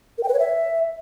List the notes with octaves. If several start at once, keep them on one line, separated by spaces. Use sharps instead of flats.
A#4
G5
B4
C#5
E5